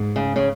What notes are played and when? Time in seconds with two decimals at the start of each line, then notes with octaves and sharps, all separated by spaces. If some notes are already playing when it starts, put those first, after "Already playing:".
Already playing: G#2
0.16 C#3
0.36 C#3